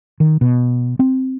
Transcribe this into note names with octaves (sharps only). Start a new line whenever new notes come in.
D#3
B2
C4